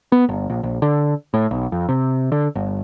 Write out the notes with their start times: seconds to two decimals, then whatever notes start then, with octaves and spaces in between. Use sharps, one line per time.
0.12 B3
0.29 G1
0.50 A#1
0.63 A#1
0.82 D3
1.34 A2
1.51 B1
1.72 F2
1.89 C3
2.32 D3
2.55 G1